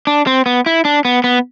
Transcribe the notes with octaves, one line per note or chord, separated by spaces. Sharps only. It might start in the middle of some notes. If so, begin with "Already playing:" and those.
D4
C4
B3
E4
D4
B3
B3